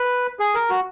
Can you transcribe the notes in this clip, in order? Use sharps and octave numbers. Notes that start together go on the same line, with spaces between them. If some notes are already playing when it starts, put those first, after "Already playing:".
Already playing: B4
G#4
A#4
F#4